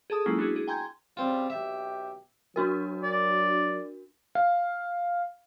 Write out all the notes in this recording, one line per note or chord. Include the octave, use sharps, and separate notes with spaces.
G#4 A4 A5 D#6
F#3 G#3 A#3 C#4 E4 F4
B3 D4 E4 F#4 G#4
G#4
G5 G#5 A#5 C6 G6 G#6
C#3 G3 C4 F4
B1 G4 E5
F#3 D4 F#4 A#4
D5
F5